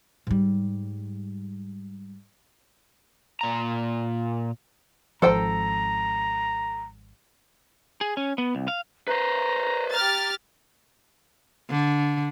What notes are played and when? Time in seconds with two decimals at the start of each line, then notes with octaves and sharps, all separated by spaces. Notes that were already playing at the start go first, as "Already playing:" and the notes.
0.27 G#2 G3
3.41 A#2 A#5
5.22 G#1 F3 A4 C5 G5 A#5
8.01 G#4
8.17 C#4
8.38 B3
8.55 C2
8.68 F5
9.08 B4 C5 A#5
9.93 G4 A#5 F6 A6
11.70 D3